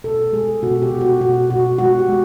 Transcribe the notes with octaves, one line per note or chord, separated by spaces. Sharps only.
B2 A4
G#3 G#4
B2 F#4
G4
B2
F#4
B2 F#4
B2 F#4
G#3 F#4
G4
G#3